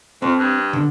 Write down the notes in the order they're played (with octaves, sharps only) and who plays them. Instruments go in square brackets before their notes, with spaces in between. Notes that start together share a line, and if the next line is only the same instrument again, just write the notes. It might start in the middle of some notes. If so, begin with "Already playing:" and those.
[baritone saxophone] F2 [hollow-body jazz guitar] C4
[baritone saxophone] G2
[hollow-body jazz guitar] D3